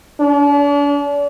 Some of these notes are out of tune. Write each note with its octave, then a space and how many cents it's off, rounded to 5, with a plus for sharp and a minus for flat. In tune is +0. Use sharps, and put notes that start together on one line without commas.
D4 -40